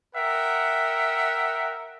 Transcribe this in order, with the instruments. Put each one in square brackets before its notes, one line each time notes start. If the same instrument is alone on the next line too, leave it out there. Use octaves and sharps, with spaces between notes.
[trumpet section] A#4 E5 F#5 G5